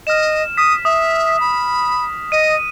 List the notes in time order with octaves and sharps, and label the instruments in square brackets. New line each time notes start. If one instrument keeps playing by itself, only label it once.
[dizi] D#5 [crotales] F6 E7
[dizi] D#6 [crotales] B6
[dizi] E5 [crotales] D#6
[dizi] B5
[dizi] D#5 [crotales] D#7